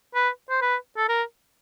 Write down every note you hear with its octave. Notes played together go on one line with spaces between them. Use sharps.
B4
C5
B4
A4
A#4